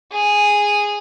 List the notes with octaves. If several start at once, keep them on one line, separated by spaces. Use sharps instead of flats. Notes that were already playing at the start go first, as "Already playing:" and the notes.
G#4